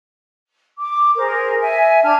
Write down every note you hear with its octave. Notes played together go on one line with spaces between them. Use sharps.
D6
G#4 A#4 C5
E5 G#5
D4 A5 F6 G#6